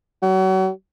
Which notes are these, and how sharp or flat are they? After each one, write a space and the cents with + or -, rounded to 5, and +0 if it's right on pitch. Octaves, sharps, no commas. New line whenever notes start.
F#3 +35